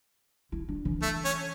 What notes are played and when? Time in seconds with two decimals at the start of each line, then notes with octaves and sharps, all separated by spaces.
0.52 E4
0.69 D4
0.85 E3
1.02 A3
1.25 C#4